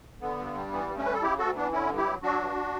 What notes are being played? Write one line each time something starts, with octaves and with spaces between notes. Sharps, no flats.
D3 B3
G2
G3
E3 B3
G2
A3 C#4
G3 B4
A4
C#3 E4 G4
D2 F#4 A4
E3 B3 D4
D3 C#4 E4
G2
E4 G4
F#3
F#3 D4 F#4
G2